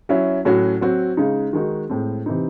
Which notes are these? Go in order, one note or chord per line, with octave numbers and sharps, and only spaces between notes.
F#3 C#4 E4
A2 F#3 C#4 F#4
F#3 C4 F#4
C#3 G#3 D#4
D#3 G#3 D#4 F#4
A2 G#3 C4
C3 E3 C4 D#4